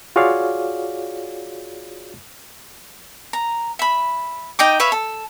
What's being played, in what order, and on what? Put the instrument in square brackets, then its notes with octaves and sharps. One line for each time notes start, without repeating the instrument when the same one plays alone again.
[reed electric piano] F4 F#4 G#4 C#5 D5 F5
[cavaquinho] A#5
E5 B5
D#4 D#5 G5 D6
B4 C#5 E5 F5
A4